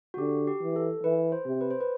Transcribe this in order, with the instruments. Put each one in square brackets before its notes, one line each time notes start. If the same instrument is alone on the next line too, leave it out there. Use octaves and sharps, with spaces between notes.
[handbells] F#4
[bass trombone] D3 [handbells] G4
[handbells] G4
[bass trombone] E3
[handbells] A4
[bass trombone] E3 [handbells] B4
[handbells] C5
[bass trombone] C3
[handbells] B4
C5
B4